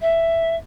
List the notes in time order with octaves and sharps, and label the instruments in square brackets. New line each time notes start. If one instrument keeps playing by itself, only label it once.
[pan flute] E5